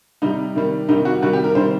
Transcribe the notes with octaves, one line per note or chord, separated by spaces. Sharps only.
C3 G3 D#4
C3 D#3 G3
C3 D#3 G3 D#4
F#4
C3 D#3 G3 F#4
G4
A#4
C3 D#3 G3 C5